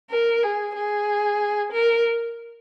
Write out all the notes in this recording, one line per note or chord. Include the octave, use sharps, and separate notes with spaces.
A#4
G#4
G#4
A#4